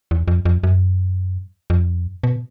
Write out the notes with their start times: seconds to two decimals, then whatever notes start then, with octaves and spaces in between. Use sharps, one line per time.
0.11 E2
0.28 F2
0.45 F2
0.64 F#2
1.70 F2
2.24 B2